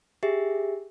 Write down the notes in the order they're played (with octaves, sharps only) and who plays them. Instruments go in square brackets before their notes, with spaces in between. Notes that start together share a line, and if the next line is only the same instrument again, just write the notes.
[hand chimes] G4 G#4 E5